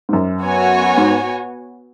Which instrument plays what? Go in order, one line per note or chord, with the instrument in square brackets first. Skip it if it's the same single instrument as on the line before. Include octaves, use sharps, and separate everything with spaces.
[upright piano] G#2
F#2
[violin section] B3 F#4 C#5 G#5
[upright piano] G#2